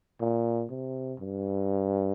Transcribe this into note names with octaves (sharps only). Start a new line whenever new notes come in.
A#2
C3
G2